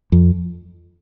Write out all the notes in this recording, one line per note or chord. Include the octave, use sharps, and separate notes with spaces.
F2